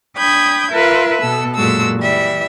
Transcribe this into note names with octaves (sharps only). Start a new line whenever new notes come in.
D4 G5 B5 D#6 G6 G#6
F4 A#4 B4 E5
B2 B3 A4 E6
F#2 A#2 G#3 F#4 A4 E6
E3 G3 E5